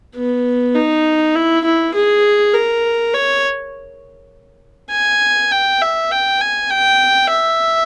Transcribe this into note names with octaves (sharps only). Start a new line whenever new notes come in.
B3
D#4
E4
E4
G#4
A#4
C#5
G#5
G5
E5
G5
G#5
G5
E5